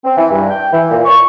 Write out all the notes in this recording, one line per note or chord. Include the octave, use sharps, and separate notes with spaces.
C4
E3
G2
G5
E3
A#2
C#6